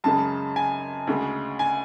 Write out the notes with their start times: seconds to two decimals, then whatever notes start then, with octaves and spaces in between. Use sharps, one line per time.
0.04 F#2 C#3 G#3 A5
0.56 G#5
1.07 D2 C#3 G#3
1.59 G#5